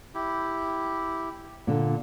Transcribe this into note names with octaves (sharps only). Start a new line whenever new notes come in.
E4 G4
A#2 D3